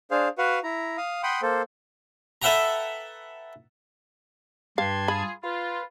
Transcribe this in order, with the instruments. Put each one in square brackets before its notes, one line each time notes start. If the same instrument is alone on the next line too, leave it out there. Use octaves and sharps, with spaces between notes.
[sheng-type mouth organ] D4 G#4 C5 F5
F#4 B4 F5 F#5
E4 A#5
F5 D#6
F#5 G5 B5 C6 D#6
A#3 A4 C5
[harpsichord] A4 B4 E5 F#5 G5 A#5
[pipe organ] G2 A5 G#6 [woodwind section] G4 B4 C6 [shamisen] F5
[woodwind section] F4 G#4 [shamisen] B5
[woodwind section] F4 [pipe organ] B4